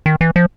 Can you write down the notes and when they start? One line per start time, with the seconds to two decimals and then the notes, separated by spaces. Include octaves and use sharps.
0.06 D#3
0.21 E3
0.36 F3